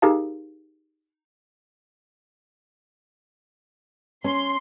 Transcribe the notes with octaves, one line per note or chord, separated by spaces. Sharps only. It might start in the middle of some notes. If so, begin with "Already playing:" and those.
D#4 G4 G#4 A#4 F5 A5
C#4 C6